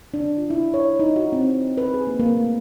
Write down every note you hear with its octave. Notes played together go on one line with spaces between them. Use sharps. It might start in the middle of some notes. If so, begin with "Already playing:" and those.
D4
F4
E4
C#5
D#4
F#4
C4
B4
G#4
A#3
A#3
A3